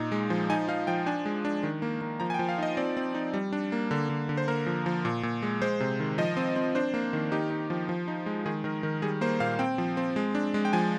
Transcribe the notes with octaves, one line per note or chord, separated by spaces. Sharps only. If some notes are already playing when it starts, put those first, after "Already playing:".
Already playing: A#2 D#4
G#3
F3
D#4 G#5
D#4 F5
F3 G5
D4 G#5
G#3
D4
D#3
A#3
A#3
F3 A#5
G#5
G5
F3
F5
D#4 D#5
C4 D5
C4
D#4
G3
D4
A#3
D3
D3
D3
C5
A#3 A#4
F3
F3
A#2
A#2
G#3
G#3 C5
C3
D#3
F3 D#5
C4
C4
D4 C5
A#3
D#3
D#4 G4
D#4
F3
F3
D#4
G#3
D#3 G#4
D#3 A#4
D#3
G3 G#4
A#3 C5
A#2 F5
C4 G5
F3
C4
G#3
D4
G#3
G5
F3 G#5